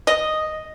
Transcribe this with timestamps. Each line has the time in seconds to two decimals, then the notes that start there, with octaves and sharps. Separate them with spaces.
0.07 D#5